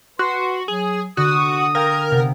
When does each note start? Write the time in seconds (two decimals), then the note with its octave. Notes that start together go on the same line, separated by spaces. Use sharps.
0.19 F#4 B4 C6
0.68 F#3 G#4
1.17 D3 F#4 D#6
1.75 A#4 F5 G5 G#6
2.11 C3 B3